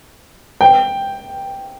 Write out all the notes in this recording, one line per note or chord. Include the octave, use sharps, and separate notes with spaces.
G5